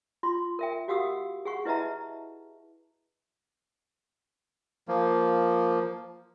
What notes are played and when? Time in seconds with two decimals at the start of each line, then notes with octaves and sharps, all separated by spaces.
0.23 F4 C6
0.59 A#4 E5 G5
0.88 F#4 G4 F5 F#5 D#6 E6
1.45 G#4 F#5 C#6
1.65 E4 B4 D#5 E5 A5 A#5
4.88 F3 A#3